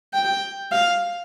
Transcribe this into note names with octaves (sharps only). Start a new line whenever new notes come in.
G5
F5